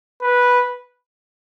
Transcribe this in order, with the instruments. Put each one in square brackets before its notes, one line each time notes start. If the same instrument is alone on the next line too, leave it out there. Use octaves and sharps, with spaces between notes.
[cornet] B4